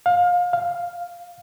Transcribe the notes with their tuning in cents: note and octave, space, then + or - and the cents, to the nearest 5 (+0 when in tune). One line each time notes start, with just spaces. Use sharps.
F5 +25
F5 +0